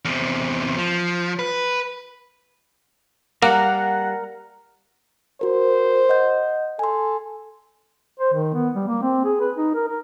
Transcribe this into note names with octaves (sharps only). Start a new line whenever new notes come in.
E2 C3
F3
B4
G3 A#3 A#4 F5 F#5 A#5
F#4 A#4 C5
D#5 F#5 G6
A4 G#5 C6
C5
D#3
B3
G3
A#3
C4
G#4
B4
D#4
A#4
A#4